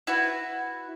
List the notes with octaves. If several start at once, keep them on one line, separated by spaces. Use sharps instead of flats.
E4 F#4 B4